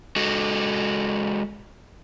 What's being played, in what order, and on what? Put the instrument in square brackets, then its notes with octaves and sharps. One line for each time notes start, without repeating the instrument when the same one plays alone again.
[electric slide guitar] G#3 F#4 A4